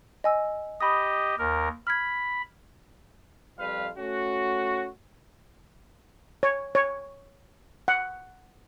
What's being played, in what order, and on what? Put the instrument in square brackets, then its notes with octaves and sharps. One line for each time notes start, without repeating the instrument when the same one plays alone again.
[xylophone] D#5 G#5 E6
[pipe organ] G4 D#5 [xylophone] B5 D#6
[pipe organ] D#2 A#4
[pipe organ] B5 [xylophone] F6 G#6
[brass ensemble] F2 G3 F4 B4 F5
A3 C#4 F#4
[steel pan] C#5
C#5
F#5